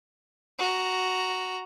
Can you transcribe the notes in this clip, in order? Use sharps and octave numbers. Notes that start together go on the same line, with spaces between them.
F#4 A#5